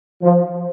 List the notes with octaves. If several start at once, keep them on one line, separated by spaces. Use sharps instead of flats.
F3